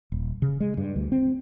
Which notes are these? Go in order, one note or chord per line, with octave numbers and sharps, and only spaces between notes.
D#1
C#3
G#3
G2
D2
C4